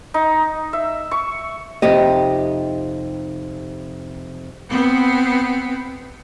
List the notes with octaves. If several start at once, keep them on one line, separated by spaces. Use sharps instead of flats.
D#4
E5
C#6
F2 C3 D#4 G4 D#5
B3 C4